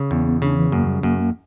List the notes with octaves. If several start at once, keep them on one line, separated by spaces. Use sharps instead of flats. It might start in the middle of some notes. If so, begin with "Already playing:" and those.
Already playing: C#3
E2 B3
B3
C#3 D4
E3
F#2 A#3
G3
F#2 A#3
A#3